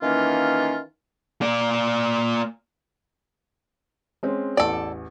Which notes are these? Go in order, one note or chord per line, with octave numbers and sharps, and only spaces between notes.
D#3 E3 A#3 C#4 D#4 F4
A#3 D5
G#3 C4 C#4
A1 E2 A4 D5